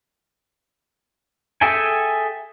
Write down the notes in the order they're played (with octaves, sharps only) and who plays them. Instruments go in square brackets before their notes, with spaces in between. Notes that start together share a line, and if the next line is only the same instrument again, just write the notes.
[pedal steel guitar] G#4 A4 E5 G5 G#5